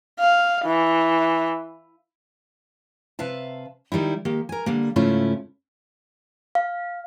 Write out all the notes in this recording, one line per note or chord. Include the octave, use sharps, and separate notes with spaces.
F5
E3
C3 B4 E5 F5 A5
D#3 G3 D#4 E4
D#3 A#3 G4
A#4 G#5
D3 G3 A#3
G#2 C#3 A3 C#4 E4 F4
F5